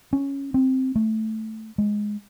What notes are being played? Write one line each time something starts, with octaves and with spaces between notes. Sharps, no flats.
C#4
C4
A3
G#3